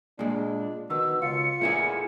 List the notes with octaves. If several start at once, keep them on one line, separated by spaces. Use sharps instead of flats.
A#2 G#3 D4
B2 D#3 E6
C#2 F4 C#7
A#2 A3 E4 G#4